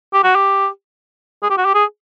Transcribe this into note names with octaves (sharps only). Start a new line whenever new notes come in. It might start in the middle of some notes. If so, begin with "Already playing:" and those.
G4
F#4
G4
G#4
G4
F#4
G4
G#4